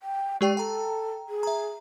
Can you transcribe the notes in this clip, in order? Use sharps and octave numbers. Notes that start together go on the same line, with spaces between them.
G5
G#3 G4 D5 G5
A4 G5 A#5
G#4
E5 A#5